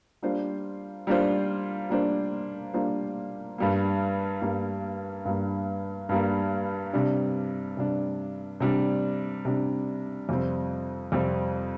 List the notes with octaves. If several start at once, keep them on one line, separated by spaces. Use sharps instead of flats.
G3 A#3 D4 F4 C5
G3 A#3 D4 F4 C5
G3 A#3 D4 F4 C5
G3 A#3 D4 F4 C5
G2 G3 A#3
G2 G3 A#3
G2 G3 A#3
G2 G3 A#3
C3 G3 D4
C3 G3 D4
C3 G3 D4
C3 G3 D4
F2 C3 G3 C4
F2 C3 G3 C4